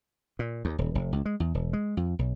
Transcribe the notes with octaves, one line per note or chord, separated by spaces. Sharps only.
A#2
D#2
D#1
F1
C#2
G#3
E2
E1
G#3
F2
B1